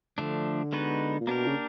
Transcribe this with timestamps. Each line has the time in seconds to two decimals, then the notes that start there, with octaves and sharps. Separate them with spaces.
0.18 D3 F3 A3 D4
0.73 G#3 B3 D#4 F#4 B4
1.20 A#2
1.27 B2 A#3 D4 G4 A#4
1.47 C#3